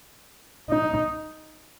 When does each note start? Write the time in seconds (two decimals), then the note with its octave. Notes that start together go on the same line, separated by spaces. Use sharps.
0.70 D#4